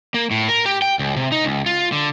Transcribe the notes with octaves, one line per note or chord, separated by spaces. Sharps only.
A#3
A2
A#4
G4
G5
C#2
C3
D#4
C#2
F4
D3